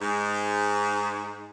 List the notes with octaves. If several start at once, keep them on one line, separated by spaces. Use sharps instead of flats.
G#2